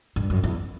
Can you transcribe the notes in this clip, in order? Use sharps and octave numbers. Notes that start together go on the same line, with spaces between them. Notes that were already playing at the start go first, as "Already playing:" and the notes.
G2
F#2
E2